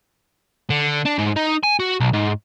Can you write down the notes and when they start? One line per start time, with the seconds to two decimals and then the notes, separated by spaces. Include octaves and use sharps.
0.70 D3
1.05 D4
1.18 G#2
1.36 D#4
1.63 G#5
1.80 F#4
2.00 B1
2.13 G#2